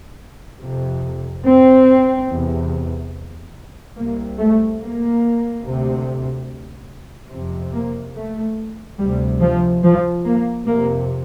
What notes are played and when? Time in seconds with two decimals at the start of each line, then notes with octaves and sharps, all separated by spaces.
0.61 F2 C3
1.45 C4
2.28 E2 C3
3.96 C2 C3 A#3
4.39 A3
4.80 A#3
5.64 D2 C3
7.31 F2 C3
7.73 A#3
8.15 A3
8.99 D2 C3 G3
9.41 F3
9.83 F3
10.25 A#3
10.66 F2 C3 A#3